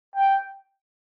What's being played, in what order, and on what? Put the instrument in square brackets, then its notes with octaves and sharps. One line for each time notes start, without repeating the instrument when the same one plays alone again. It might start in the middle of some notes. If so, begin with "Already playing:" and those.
[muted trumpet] G5